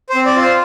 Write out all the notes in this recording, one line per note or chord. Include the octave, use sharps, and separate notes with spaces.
C5
C4
D5
F4
C5